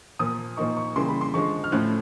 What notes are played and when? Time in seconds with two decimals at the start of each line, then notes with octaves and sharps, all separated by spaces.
0.19 A#2 F3 A#3 D#6
0.57 A#2 F3 A#3 D#4 C#6
0.77 C#6
0.96 C#3 E3 G3 A#3 C6
1.09 B5
1.21 C6
1.34 D3 F3 G#3 C#6
1.64 F6
1.72 A2 F3 A3 C#4 F#6